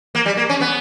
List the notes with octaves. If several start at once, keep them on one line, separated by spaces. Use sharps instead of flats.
A#3
G3
A#3
C#4
B3